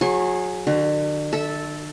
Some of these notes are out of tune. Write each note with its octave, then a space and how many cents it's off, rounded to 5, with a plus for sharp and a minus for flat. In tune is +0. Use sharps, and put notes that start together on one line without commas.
F#3 -25 G#4 +0 C#6 -45
D3 +40 F#4 +25
A4 +0 E5 -10